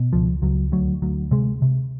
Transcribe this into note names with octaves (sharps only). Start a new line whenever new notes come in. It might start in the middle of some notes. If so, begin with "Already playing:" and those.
Already playing: B2
C#2 F3
C#2 F#3
D2 F#3
D2 F#3
C3 G#3
C3